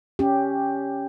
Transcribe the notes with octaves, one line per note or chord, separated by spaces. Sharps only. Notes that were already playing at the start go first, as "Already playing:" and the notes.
C#4 G4